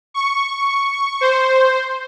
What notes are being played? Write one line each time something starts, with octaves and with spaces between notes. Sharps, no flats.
C#6
C5